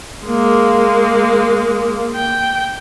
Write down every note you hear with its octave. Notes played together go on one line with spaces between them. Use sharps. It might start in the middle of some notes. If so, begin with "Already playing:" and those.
G#3 A#3
G5